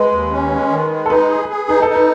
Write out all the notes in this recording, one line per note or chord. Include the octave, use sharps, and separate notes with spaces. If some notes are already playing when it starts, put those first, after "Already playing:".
Already playing: G#3 B4
D#2
C#4
G#3
D#3
G#3
A4
D#4 B4
G#4
G#4
D#4 B4
A4
D#4
B4